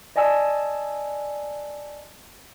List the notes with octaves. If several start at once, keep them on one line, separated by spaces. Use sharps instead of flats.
D5 D#5 G#5 A5 E6